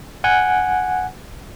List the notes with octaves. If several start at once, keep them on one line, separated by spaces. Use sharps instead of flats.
F#5 G#5